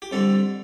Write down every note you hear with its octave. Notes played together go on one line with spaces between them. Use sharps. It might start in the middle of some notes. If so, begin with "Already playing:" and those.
G4
F2 D3 G3 A4